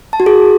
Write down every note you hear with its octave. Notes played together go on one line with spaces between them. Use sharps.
A5
F#4
G#4